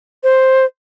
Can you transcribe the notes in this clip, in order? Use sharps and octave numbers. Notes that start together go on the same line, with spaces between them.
C5